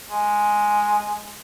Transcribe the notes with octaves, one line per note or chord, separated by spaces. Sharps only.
G#3